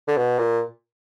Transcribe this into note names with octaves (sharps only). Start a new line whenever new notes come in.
D3
B2
A#2